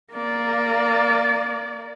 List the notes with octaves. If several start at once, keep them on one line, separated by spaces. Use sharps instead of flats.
A#3 D5